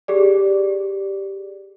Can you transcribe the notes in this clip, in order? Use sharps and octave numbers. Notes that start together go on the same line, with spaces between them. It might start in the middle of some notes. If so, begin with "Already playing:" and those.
G4 G#4 D5